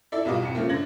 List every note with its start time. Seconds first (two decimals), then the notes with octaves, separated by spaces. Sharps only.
0.12 E4 A4 D5 E5
0.25 B1 B2 G3 F4 D#5 D6
0.42 B1 F2 C#7
0.55 C#3 F3 A3 A#3
0.69 G1 D3 G#6 A#6 F#7